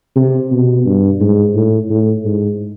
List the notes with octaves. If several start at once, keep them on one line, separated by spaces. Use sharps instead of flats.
C3
B2
G2
G#2
A2
A2
G#2